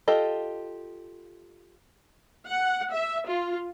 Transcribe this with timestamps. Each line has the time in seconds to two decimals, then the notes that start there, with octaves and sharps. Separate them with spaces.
0.08 F4 G4 A4 D#5
2.48 F#5
2.94 E5
3.27 F4